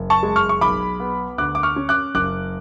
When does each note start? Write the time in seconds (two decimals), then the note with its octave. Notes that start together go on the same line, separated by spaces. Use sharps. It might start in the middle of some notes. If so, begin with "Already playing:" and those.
Already playing: F#1
0.10 A5 C#6
0.23 G#3
0.36 C#6 F6
0.49 C#6
0.61 B1 B5 D6
1.00 B3
1.38 D2 D6 F#6
1.55 D6
1.63 C#6 F6
1.76 C#4
1.89 D6 F#6
2.15 F#1 D6 F#6